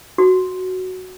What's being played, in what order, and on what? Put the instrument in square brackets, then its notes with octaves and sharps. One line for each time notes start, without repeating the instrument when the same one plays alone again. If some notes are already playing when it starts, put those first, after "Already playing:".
[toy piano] F#4